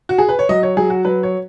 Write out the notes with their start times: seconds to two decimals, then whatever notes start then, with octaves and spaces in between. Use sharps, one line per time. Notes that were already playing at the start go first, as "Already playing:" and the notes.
0.09 F#4
0.18 G#4
0.29 B4
0.39 C#5
0.49 F#3 D#5
0.63 C#5
0.77 F#3 G#4
0.90 F#4
1.05 F#3 B4
1.23 C#5